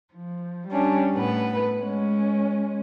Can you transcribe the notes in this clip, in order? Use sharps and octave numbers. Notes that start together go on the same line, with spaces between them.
F3
G3 C#4 D4
A2 B3 B4
G#3 C#4